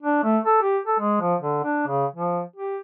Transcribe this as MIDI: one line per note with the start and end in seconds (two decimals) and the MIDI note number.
0.03 0.20 62
0.24 0.38 57
0.45 0.57 69
0.62 0.78 67
0.87 0.99 69
0.99 1.16 56
1.21 1.35 53
1.41 1.60 50
1.64 1.84 62
1.87 2.05 49
2.16 2.41 53
2.56 2.78 67